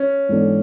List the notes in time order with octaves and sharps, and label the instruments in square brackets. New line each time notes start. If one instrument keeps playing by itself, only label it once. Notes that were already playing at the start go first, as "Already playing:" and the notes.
Already playing: [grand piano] C#4
[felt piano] G#2 E3 B3 D4 A4